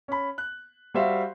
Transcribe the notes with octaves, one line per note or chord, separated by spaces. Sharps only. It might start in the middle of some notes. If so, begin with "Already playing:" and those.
C#4 B5
F#6
G3 F#4 C5 E5 F5